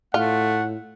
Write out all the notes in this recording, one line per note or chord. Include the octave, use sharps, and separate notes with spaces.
A2 A3 F4 F#5